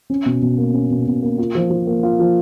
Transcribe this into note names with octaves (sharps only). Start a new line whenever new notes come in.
C#4
B2
B2
A#3
C#4
B2
B2
A#3
F4
F3
F3
A#3
F4
F3